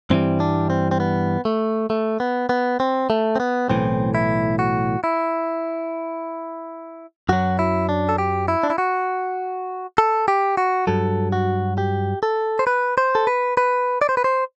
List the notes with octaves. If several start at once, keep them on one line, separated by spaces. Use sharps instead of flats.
G2 E3 G3 C4
D4
C4
C4
B3
A3
A3
B3
B3
C4
A3
C4
B3
B1 A2 E3 C4
E4
F#4
E4
F#2 F#3 F#4
E4
D4
A4
G4
E4
D4
E4
F#4
A4
G4
F#4
G2 F#3 A4
F#4
G4
A4
C5
B4
C5
A4
B4
B4
D5
C5
B4
C5